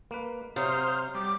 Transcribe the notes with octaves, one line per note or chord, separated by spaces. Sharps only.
A#3 B4
C3 F#3 C5 F5 D#6
G3 D6